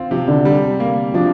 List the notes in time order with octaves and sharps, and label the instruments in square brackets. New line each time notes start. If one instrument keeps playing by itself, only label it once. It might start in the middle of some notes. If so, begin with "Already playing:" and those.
Already playing: [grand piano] C4 F4
[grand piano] C3 [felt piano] F3
[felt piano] D3
[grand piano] G3
A#3
[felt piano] F3 [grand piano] D4